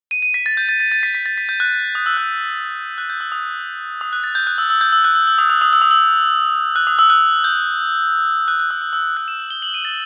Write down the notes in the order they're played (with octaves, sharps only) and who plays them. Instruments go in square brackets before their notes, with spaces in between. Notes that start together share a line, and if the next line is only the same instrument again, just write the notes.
[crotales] D#7
D#7
B6
A6
G6
A6
A6
A6
B6
B6
A6
B6
G6
F#6
D#6
E6
F#6
F#6
G6
E6
D#6
D#6
F#6
A6
G6
F#6
E6
E6
G6
E6
F#6
E6
E6
D#6
D#6
D#6
E6
D#6
E6
F#6
D#6
E6
F#6
G6
F#6
F#6
E6
E6
E6
F#6
E7
F#7
G7
F#7
D#7
A6